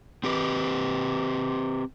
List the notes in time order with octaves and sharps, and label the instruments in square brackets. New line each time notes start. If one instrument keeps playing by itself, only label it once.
[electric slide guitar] C4 G4 B4